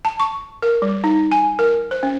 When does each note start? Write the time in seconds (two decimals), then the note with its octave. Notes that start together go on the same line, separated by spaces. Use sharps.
0.05 A5
0.20 C#6
0.62 A#4
0.82 G3
1.04 D#4
1.32 G#5
1.59 A#4
1.91 C5
2.03 C#4